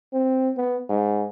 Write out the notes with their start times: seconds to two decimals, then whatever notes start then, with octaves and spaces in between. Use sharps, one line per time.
0.13 C4
0.57 B3
0.89 G#2